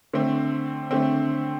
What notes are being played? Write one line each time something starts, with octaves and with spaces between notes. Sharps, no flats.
D3 A3 C4
D3 A3 C4